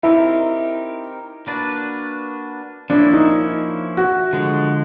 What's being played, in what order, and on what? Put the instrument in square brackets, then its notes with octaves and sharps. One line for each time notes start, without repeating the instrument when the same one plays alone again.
[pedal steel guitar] C4 D#4 G4 A#4 [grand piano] E4
[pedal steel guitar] A#3 D4 F#4 B4 D5
[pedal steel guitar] F3 A#3 C#4 E4 [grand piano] D4
[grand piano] D#4
F#4
[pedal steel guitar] D3 F3 G#3